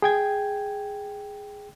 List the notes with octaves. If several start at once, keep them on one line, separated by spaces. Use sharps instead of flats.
G#4 G5 G#6